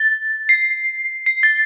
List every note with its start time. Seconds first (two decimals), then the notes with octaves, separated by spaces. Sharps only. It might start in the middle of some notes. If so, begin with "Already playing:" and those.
Already playing: A6
0.49 C7
1.26 C7
1.43 A6